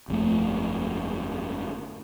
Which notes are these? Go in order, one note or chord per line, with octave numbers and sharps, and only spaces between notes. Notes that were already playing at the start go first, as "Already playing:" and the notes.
G1 F2 G#2 A3